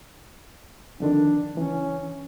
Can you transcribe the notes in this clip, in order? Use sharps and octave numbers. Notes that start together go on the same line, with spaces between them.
F2 D3 D#3 D4
C#2 E3 C#4